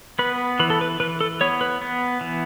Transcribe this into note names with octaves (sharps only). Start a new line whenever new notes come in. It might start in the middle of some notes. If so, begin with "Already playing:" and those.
B3 B4
E3 B4
A4
B4
E3 B4
A4
B3 C#5
B4
B3
E3